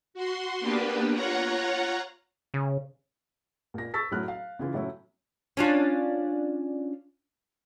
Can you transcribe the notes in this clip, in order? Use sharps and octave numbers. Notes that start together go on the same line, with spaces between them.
F#4 C6
A#3 B3 D4 G4 B4
F4 C#5 F#5 A#5
C#3
A#2 A#6
C#6 E6 A6 B6
A2 F#3 F6 F#6
F5
C#3 E3 F4
A2 F#3 C#4 E4
C#4 D4 F4